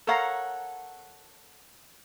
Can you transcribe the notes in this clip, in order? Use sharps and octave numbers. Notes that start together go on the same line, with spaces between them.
A4 A#4 C#5 F5 F#5 A#5